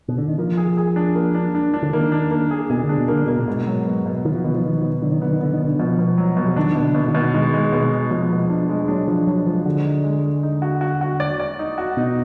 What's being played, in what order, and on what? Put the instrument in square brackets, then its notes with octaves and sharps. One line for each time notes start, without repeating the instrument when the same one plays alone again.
[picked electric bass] B2
D3
D#3
[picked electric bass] F3 [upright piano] A#3
[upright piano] G#4
G#4
D4
A#3
D4
D4
D4
[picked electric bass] D3
[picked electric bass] D#3 [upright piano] A#3
[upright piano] D4
A#3
G#4
[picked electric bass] B2 [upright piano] G#4
[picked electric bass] D3
[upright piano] D4
[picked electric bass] B2
[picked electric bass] D3 [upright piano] A#3
[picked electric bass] B2 [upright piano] A#3
[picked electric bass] A#2
[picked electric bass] G#2 [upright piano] B2
[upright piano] F#3
B3
B2
[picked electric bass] D#3 [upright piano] B3
[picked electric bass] F3
[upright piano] B2 [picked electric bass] D#3
[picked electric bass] F3
[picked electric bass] D#3 [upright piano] B3
[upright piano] B2
[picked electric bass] D3 [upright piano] F#3
[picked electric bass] D#3
[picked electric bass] D3 [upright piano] B3
[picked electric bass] D#3
[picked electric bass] D3 [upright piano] B3
[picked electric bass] D#3
[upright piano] B2 [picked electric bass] D3
[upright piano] B2 [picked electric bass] F3
[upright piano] B2
F#3
B2
[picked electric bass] F3
[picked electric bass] D#3 [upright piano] D4
[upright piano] B2
[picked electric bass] D3
[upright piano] B2
[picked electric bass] D#3
[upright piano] B2
[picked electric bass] D#3 [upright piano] G#3
[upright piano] G#3
B2
G#3
[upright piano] B2 [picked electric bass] F3
[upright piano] B2
D4
G#3
[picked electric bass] F#3 [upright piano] D4
[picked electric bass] F3 [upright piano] D4
[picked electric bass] F#3 [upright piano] D4
[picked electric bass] F3 [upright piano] G#3
[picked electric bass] D3 [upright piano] F#4
[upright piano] D#4
G#3
G#3
D#4
F#4
F#4
F#4
D5
D5
D#4
F#4
[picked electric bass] B2 [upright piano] D#4